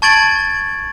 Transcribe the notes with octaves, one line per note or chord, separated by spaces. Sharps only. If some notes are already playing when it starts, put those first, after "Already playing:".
A5 C#6 G#6 A6 D7 F#7